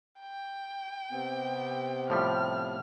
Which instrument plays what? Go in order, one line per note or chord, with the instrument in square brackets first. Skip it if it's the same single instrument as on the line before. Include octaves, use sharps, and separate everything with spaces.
[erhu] G5
[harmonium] C3 B3 C4
[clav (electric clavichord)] A2 F3 G3 [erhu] F6